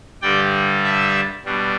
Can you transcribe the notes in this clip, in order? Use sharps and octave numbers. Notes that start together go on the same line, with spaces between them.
G2 D3 G3 D5 G5
E5 A5
B2 G3 D4